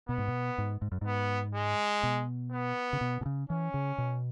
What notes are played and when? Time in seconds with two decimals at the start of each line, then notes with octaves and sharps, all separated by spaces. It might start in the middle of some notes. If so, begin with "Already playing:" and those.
0.09 B2 B3
0.18 G#2
0.28 B2
0.58 G#2
0.82 G#2
0.92 F#2
1.01 G#2 B3
1.55 G#3
2.03 B2
2.52 B3
2.93 C#3
3.01 B2
3.21 B2
3.26 C#3
3.50 E3 C#4
3.74 C#3
3.98 B2